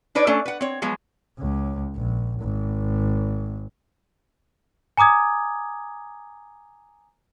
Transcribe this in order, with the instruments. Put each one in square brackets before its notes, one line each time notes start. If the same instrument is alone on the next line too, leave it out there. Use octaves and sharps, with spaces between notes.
[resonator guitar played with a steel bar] D4 D#4 B4 C#5 D5
A3 C#4 D4 A4
B4 F#5
C4 C#5
F3 F#3 G#3 B3
[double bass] C#2
A#1
G#1
[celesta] G#5 A#5 D6 D#6 G#6